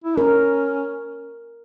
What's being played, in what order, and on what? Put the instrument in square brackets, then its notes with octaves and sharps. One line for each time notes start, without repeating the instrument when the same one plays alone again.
[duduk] E4
[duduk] C#4 [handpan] A#4